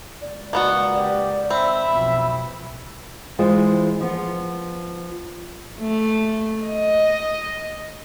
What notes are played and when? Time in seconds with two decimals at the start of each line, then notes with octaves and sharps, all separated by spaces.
0.21 C#2 D5
0.53 A#3 B3 F#4
0.95 G4 D5
1.50 C4 E5 B5
1.90 B1 F2
3.39 E3 G#3 F4 C5
4.01 F3 B3
5.80 A3
6.66 D#5